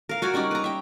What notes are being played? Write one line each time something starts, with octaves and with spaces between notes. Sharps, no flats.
A#4 F5
F#4 A#4 D5 G#5
G3 C#4 D#4 D5
B4 A#5
E5 G5